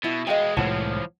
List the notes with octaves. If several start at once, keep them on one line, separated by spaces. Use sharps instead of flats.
B2 E4
B2 G#3 D#5 F5 G5
C2 A2 E3 F3 G#3 C#5 F#5 A5